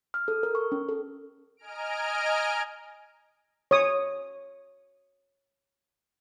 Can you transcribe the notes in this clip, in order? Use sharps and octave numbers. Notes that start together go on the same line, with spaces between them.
F6
A4
A#4
C#6
C#4
A4
D#5 G#5 A#5 F6 D7
C#5 D#6